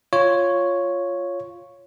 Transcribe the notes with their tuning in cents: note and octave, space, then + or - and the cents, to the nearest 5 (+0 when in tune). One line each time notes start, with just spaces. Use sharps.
F4 +0 C#5 +0